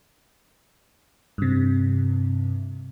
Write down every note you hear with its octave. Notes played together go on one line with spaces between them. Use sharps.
G2 C3